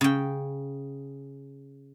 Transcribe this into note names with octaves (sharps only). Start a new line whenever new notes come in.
C#3 G5